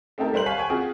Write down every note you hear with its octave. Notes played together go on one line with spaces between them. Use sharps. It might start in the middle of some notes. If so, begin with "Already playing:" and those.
A3 C4 D#4 G4 A4 A#4
G3 A#4 C5 C6 F#6 F#7
C#5 F5 F#5 G#5 B6
G5 G#5 C#6
C4 F4 F#4 G#4